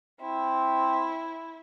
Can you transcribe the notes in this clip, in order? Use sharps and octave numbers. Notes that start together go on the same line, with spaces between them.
C4 E4